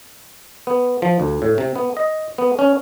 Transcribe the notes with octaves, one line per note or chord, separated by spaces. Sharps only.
B3
F3
D2
A2
C3
B3
D#5
B3
C#4